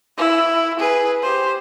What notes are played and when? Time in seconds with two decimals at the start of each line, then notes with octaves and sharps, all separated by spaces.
0.18 E4
0.80 G#4 B4
1.22 G4 C5